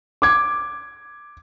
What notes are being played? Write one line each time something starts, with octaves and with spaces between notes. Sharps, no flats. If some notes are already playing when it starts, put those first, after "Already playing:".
D6 G#6